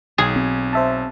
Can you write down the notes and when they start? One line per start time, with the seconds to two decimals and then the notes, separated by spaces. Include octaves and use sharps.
0.18 B1 G#4
0.36 C4
0.73 C5 E5 A5